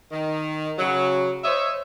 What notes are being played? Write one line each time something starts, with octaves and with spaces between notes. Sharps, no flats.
D#3
C#3 F#3
C5 C#5 D#5 E5